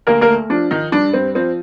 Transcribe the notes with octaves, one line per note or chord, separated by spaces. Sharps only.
D2 A#3 A#4
A#3 A#4
A3
F3 D4
D#3 F3 D#4
G2 D4
G2 C4
F3 C4